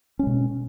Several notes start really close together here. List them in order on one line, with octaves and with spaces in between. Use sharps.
C#4 G#3 B2